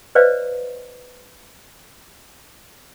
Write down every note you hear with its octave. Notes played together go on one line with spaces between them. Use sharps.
B4 C5 D5 D#5 F5